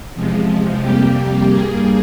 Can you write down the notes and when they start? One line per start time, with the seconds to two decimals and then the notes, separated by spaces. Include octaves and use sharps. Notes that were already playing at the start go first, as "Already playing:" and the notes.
0.15 E2 C3 F3 G#3
0.82 F2 C3 G3 A#3 G4
1.48 G2 G3 A#3 G#4